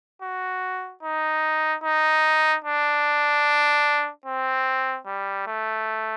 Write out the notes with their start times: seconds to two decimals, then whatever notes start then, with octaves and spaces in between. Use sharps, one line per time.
0.22 F#4
1.03 D#4
1.84 D#4
2.65 D4
4.26 C4
5.06 G3
5.47 A3